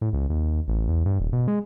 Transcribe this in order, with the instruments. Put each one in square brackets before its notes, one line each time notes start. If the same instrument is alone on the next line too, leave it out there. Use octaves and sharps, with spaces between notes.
[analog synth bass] A2
C#2
D#2
A1
E2
G2
D#1
B2
G#3